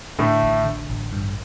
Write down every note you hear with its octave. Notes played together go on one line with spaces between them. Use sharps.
A2 D3 A3
A1
D3
A1
G2